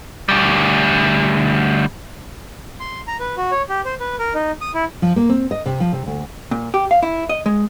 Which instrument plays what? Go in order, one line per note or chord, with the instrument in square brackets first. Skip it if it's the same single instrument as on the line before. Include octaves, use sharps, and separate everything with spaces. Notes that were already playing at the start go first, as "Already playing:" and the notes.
[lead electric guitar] D2 G3
[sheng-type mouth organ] C6
A#5
B4
F#4
C#5
G4
C5
B4
A#4
D#4
D#6
E4
[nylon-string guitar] F3
A#3
C4
D#5
C3
F3
C3
D2
[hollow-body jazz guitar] A#2
G4
F5
E4
D#5
G#3